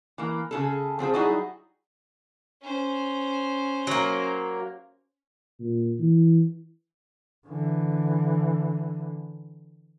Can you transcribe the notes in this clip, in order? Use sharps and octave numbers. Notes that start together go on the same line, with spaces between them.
E3 A#3
C#3 G#4 A4
F3 C4 G#4 C5
F#3 G3 D#4 E4 F#4 G#4
C#4 C5
F#3 A#3
A#2
E3
D3 E3